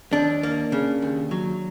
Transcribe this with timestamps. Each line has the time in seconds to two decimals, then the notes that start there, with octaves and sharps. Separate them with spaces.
0.13 D#2 D4
0.43 A#3
0.72 C#3
1.02 D#2
1.31 F#3